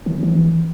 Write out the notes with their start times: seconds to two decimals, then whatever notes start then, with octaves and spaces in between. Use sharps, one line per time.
0.06 D#3
0.23 E3